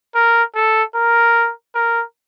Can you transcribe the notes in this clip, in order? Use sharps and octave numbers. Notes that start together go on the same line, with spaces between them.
A#4
A4
A#4
A#4